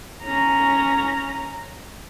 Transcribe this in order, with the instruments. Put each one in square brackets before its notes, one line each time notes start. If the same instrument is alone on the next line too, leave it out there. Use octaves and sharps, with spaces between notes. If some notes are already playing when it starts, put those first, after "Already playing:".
[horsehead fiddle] C#4 A#5